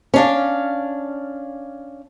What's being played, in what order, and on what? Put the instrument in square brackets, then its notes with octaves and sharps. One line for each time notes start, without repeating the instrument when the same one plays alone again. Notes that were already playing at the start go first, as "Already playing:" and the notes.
[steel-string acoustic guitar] C#4 D4 F5